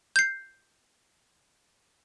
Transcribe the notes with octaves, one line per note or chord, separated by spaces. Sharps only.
G6 C7